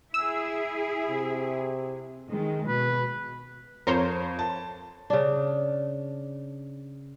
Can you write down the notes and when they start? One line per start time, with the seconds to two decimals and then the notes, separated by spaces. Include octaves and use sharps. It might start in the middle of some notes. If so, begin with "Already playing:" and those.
0.14 E4 G#4 E6
1.09 C3
2.29 D#3 G#3
2.68 B2 B4
3.87 F2 A#4 C5 C#5
4.39 A5
5.10 C#3 D4